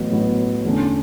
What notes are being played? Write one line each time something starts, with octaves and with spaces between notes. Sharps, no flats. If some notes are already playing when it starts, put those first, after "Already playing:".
Already playing: A1 A2 F#3 B3
A1 A2 F#3 B3
E2 D3 A3 C#4